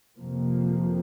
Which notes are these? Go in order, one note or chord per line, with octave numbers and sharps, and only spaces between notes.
F2 C3 F3 A#3